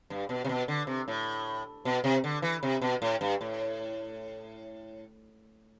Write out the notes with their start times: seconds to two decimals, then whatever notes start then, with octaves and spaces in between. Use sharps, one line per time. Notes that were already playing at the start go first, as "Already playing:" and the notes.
0.10 G2
0.29 B2
0.45 C3
0.49 B2
0.68 D3
0.87 C3
1.08 A2
1.85 B2
2.04 C3
2.24 D3
2.42 E3
2.63 C3
2.82 B2
3.02 A2
3.21 G2
3.41 A2